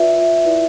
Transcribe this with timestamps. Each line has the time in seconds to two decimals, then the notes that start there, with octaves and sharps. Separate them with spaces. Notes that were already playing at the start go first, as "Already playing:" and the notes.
Already playing: F4 B4 D5 E5
0.45 E4 B4 D5